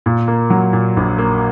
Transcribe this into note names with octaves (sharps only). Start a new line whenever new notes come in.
A#2
A#3
F#3
A#2
A#1
A#3